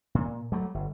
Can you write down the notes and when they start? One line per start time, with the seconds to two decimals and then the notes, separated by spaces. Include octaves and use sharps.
0.15 A#2
0.52 F#3 G3 A3
0.74 G1